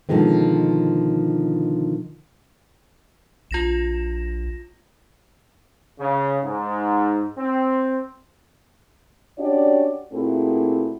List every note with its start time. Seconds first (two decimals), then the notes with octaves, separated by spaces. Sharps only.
0.09 B2 D3 D#3 F3 G#3 C4
3.51 A#1 F4 A#6 E7
5.98 C#3
6.43 G#2
7.37 C4
9.37 C#4 D4 F#4 G4 C#5 D5
10.13 A#2 A3 C4 E4 F#4 G#4